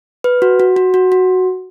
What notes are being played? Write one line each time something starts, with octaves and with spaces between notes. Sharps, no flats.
B4
F#4
F#4
F#4
F#4
F#4